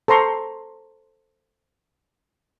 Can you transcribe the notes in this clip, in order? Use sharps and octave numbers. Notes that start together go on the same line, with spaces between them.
A4 C5 A#5 C6 C#6